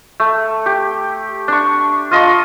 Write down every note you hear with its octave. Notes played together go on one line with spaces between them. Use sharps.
A3
G4
D4 C#6
F4 D#5 A5 C#6